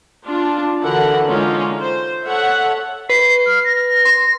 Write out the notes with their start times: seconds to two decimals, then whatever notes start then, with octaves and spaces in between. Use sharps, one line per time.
0.25 D4 F4
0.82 D3 E3 F#4 A4 A#4 F#5
1.24 D3 G#3 C#4 D#4 F4
1.80 C5
2.25 A4 C#5 E5 F#5
3.10 B4 C7
3.46 F6
3.64 A#6
4.05 C6